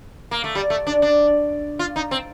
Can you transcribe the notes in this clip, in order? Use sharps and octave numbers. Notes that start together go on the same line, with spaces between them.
A#3
A3
G3
A3
D4
D4
F4
D#4
C4